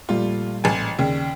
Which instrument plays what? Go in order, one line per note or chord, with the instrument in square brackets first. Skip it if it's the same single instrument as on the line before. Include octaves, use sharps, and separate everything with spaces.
[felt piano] A#1 G3 A3 [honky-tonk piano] F4
[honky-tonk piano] A1 G#5
[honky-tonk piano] D#2 C#3 [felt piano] D5